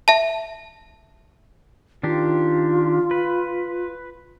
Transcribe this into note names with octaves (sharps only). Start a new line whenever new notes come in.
E5 A5
D#3 D4 F4 G4
B4